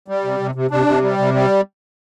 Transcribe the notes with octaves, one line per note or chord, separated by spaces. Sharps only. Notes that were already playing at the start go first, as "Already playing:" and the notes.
G3
C3
C3
C3
C3 D4
C3
G3
C3
G3